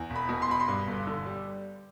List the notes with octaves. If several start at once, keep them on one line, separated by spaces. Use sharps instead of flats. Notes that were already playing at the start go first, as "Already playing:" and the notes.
Already playing: E2
E1
B5
B2
C6
E1 B5
C6
G2
G1
D3
G3